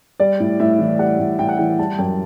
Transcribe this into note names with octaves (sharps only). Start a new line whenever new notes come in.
G3 D5
A2
A2 E5
E3
G3 F#5
A2
A2 G5
F#5
E3 G5
G3 A5
F#2 G5